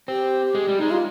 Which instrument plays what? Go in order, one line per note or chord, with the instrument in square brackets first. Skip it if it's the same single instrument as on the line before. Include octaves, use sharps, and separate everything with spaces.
[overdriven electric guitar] C4 [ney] G4
[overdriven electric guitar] G#3
G3
[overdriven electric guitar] G#3 [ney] D#4
[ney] F4